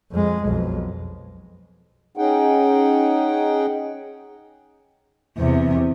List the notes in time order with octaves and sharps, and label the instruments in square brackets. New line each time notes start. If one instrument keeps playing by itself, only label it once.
[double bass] F2 G#3
B1 F2
[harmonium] C#4 D#4 G#4 F#5 G5
[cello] E2 C3